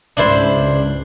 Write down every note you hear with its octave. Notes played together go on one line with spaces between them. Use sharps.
C#2 G#2 D4 E4 C5